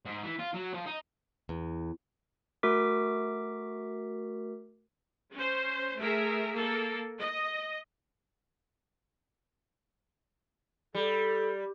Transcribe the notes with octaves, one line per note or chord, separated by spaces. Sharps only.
G#2
E3
F4
F#3
F3
D#4
E2
A3 F#4 A#4 D6 B6
C#4 C5
A3 G#4 A#4 E5
A#3 A4
D#5
G3 A4